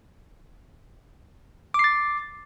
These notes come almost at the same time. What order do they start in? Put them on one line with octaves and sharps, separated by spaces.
D6 C7 A6